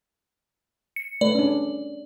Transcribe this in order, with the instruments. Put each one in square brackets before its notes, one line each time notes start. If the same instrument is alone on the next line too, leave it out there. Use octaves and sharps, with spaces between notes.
[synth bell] C#7
[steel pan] A3 B4 [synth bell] D5
[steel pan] C#4 D4